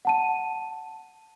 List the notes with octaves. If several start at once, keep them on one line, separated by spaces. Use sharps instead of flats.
F#5 A5 D#7